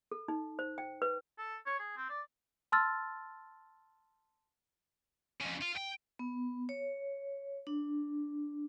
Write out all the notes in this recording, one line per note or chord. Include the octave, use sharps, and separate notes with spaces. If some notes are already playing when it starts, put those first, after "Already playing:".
A4
D#4
C5
G5
B4
A4
C#5
G#4
C4
D5
A5 C6 E6 F6 A6
F2 C#3
F4
G5
B3
C#5
D4